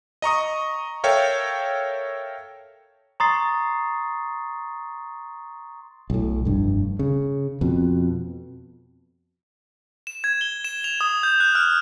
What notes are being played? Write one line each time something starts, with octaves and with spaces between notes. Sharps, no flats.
D#5 A#5 C#6 D#6
A4 A#4 C#5 E5 F5 G5
A#5 C6 C#6 D#6 A6 C7
B1 A2
F1 G2
C#3
F2 B2
E7
G#6
G7
E7
F7
D#6
G6
F#6
F6